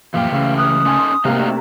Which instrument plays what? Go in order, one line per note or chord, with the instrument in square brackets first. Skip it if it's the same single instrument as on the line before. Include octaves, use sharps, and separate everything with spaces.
[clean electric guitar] F#2 A#2 F3 [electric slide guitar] E3 G4 G5 [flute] F5
[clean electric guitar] C#2 C#3 A3 [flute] F5
[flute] D#6 [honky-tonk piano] F6 F#6
[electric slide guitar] C#4 D#4 A4 [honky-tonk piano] G#5 C6
[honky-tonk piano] C3 A#3 [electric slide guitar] D#4 F#4 F5
[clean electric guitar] A3 D4